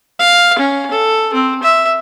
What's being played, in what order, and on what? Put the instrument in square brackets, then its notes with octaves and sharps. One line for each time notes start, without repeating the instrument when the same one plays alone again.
[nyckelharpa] F5
C#4
A4
C4
E5